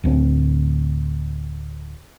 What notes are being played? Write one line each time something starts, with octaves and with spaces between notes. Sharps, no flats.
D1 D2 C4